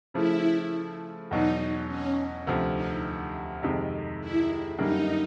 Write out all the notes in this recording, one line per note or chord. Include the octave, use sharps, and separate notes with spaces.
C#3 F3 A3 E4
E2 B2 F#3 D#4
C#4
D2 C3 F3
D#4
F2 C3 D#3 G#3
E4
F#2 D3 G3 A#3 D#4